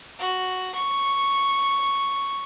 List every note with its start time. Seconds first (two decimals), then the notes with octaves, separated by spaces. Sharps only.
0.19 F#4
0.74 C#6